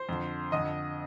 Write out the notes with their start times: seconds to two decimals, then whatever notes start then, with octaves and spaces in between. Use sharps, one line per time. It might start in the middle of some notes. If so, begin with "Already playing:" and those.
Already playing: C5 C6
0.09 F2 D3
0.52 F2 D3 D#5 D#6